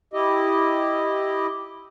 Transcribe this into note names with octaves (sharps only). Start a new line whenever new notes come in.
E4 G4 D#5